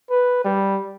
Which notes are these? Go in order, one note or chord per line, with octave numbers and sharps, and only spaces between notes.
B4
G3